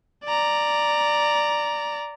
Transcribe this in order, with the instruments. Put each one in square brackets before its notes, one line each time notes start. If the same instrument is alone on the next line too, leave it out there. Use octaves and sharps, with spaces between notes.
[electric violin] D5 A#5